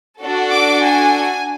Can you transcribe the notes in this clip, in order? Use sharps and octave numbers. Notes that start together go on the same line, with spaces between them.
D4 F#4 A4
D6
G#5